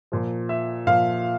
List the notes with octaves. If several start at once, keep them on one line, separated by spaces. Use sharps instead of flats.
A#2 F3
E5
A#2 F3 F5